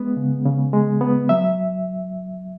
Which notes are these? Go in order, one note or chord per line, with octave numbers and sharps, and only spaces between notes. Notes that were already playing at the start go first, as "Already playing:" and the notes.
Already playing: G#3 B3
C#3
C#3
G#3
B3
F#3 E5